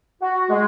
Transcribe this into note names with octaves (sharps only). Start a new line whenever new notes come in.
F#4
G#3